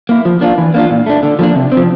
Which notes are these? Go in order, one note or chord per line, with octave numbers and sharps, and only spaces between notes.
A#3 E4
F3
A#3 D4 F4
E3
A#3 D4 F4
A#2
A3 D4
D3
F3 A#3 D4
C3
C4
F3